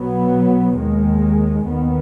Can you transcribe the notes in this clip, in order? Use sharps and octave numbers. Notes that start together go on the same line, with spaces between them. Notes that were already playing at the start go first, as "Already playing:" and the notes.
Already playing: B1 B2 F#3 B3
D#2 D#3 G#3
D#2 D#3 B3